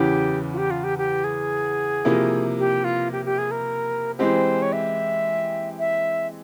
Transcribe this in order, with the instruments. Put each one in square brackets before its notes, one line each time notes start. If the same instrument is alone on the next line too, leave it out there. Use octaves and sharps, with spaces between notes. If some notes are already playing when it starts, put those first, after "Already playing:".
Already playing: [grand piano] E2 C#3 E3 [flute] G4
[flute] F4
G4
F4
G4
G4
G#4
[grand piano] C3 F3 A#3 E4 A#4
[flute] G4
F4
G4
G4
G#4
A#4
[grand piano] E3 G#3 C4 G4 [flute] C5
[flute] C#5
E5
E5